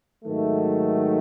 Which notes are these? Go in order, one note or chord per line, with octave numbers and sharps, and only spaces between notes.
G#2 D#3 F#3 A3